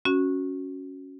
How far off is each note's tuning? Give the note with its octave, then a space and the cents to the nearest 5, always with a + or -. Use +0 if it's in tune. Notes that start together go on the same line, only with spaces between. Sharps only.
C#4 +0 F#4 +0